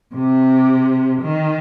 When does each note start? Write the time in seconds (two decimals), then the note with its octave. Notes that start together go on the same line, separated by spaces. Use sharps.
0.15 C3
1.21 D#3